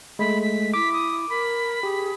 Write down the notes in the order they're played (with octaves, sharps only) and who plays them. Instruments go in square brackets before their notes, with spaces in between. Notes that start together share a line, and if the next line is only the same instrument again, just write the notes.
[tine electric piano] G#3 A3 [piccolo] B5
[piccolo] B6
[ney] E4 [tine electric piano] D6 [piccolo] B6
[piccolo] D#6
[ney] A#4 [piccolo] B5
[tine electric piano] G4 [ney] G#4